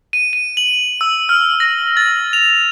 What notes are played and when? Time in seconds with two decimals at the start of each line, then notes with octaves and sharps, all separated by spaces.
0.13 D#7
0.33 D#7
0.57 F#7
1.01 E6
1.29 F6
1.60 A#6
1.97 A6
2.33 F7